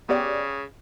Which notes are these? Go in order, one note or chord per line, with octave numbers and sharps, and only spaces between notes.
C#3 B3 G4 D5